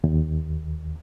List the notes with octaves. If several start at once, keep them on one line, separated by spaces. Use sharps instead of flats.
D#2